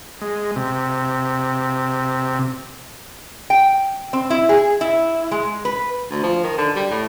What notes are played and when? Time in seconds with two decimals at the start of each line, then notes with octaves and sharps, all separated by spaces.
0.21 G#3
0.56 C3
3.50 G5
4.13 C4
4.30 E4
4.49 G#4
4.81 E4
5.32 G#3
5.65 B4
6.10 D2
6.23 F3
6.44 D#3
6.58 D3
6.76 G3
6.90 A2